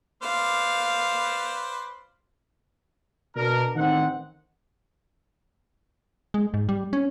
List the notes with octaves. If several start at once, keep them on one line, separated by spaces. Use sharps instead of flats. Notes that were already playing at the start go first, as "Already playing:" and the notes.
B4 C5 D5 F5
B2 D4 A#4
A1 D#3 C4 D#4 F#5
G#3
G#2
G3
C#4